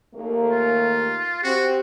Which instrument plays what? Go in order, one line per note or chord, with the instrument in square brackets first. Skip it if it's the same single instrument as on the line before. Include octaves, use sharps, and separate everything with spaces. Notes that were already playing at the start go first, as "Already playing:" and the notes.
[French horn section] D#2 A3 A#3
[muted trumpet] F4
[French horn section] C4 G4 [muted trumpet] F#4